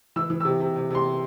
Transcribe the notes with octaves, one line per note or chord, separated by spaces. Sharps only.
E3 E6
E3
C3 E6
C3
C3
C3 C6